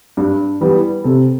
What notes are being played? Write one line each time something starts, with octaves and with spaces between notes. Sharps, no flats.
G2
E3 G3 B3
C3 A4